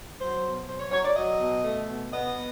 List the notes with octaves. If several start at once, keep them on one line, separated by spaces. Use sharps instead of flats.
F#3 C5
B2
F#3 C5
C#5
F#3 C#5
D5
F#3 D#5
B2
A3
B2
B3 D#5
B3